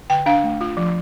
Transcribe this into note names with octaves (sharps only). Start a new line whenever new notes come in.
D3 G5
D4 F5
A3
F4
F3